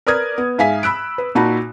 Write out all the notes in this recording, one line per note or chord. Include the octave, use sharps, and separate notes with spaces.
A#4 B4 D5 D#6 F6 G#6
B3
G#2 E5 F5 G#5 B6
B5 E6 F#6 D7
B4
A#2 D#4 F#4 A5 B5